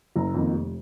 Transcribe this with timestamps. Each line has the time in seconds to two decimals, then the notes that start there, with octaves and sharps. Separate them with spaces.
0.16 F#1 A#5
0.34 F2 D#3 A#3
0.53 F1